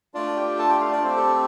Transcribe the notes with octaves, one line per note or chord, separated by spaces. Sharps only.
A3 D4 F4 D5
G4 G5
A4 A5
G4 G5
F4 F5
D4 D5
A3 C4 G4 C5
A4